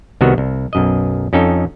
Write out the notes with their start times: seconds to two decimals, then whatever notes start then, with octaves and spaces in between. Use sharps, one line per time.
0.21 C2 C3 D#3 B3 F#4
0.38 C2
0.73 B1 F#2 D#5
1.33 F2 C#4 D#4 A4 G5